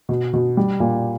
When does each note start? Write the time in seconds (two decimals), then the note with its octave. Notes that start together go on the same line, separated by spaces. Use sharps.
0.09 B2
0.33 B2
0.57 G3
0.80 A#2